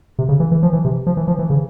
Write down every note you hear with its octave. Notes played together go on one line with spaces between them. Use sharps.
C3
C#3
E3
E3
F3
E3
C3
F3
E3
F3
E3
C#3